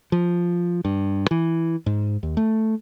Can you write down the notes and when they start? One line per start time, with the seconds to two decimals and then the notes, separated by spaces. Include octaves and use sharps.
0.12 F3
0.85 G2
1.31 E3
1.86 G#2
2.23 D#2
2.37 A3